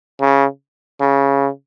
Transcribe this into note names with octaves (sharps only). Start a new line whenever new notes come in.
C#3
C#3